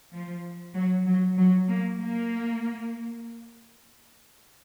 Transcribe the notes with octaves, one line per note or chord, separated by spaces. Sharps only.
F3
F#3
F#3
F#3
A#3
A#3